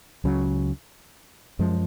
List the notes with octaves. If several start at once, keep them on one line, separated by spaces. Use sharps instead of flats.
C#2 C#3 F#3
F#2 F3 G#3